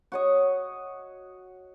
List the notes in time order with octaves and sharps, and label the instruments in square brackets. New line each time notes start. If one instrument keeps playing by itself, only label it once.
[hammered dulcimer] F#4 C#5 D#5